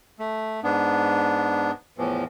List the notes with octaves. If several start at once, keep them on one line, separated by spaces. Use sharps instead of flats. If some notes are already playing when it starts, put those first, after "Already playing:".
A3
G#2 B3 D4
E2 A2 E3 F3